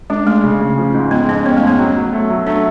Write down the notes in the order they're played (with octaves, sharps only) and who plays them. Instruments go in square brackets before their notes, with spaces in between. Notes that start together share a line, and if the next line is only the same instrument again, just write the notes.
[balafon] G#3 [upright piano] D4
[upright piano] G#3 [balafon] A3
[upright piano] C#3
C#3
F3
G#2
[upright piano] G#3 [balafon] B3
[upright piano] F2 [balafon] C#4
[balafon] B3 [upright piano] C#4
[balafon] A3
[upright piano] G#2
[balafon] B3
[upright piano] F#3
F#3
A3
F#3
[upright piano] A3 [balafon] D4